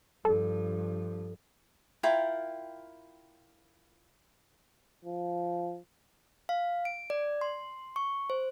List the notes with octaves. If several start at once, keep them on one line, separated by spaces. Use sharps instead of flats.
G2 F3 A4
E4 F4 A#4 G5
F3
F5
D7
D5
C6
C#6
C5